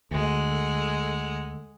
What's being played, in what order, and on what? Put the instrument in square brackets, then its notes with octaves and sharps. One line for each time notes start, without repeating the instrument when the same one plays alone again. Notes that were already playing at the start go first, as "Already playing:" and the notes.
[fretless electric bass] D2 [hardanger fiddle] G#3 F#5 [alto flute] A4